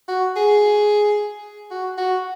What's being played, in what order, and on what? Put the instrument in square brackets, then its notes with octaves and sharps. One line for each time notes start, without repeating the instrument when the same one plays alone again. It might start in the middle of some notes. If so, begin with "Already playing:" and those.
[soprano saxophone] F#4
G#4
F#4
F#4